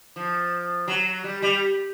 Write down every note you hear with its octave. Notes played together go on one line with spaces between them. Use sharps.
F3
F#3
G3
G3